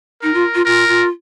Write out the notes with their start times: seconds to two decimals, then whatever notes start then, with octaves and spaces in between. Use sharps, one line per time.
0.22 D#4 A#4
0.33 F4
0.54 F4
0.65 F4 A#4
0.88 F4